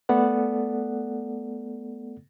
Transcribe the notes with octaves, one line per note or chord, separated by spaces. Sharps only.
A3 B3 A4 D5 F#5